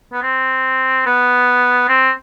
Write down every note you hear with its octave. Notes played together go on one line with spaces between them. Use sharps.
B3
C4
B3
C4